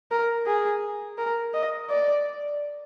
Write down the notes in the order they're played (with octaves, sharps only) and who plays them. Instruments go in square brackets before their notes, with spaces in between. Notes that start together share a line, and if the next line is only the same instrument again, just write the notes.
[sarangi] A#4
G#4
A#4
D#5
D5